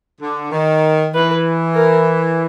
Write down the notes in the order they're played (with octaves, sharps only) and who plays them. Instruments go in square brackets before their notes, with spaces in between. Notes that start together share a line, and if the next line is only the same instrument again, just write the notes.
[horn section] D3
D#3
[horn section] E3 [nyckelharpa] B4
[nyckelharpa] A#4